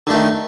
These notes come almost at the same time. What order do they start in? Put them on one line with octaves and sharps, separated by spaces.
D3 A3 D#3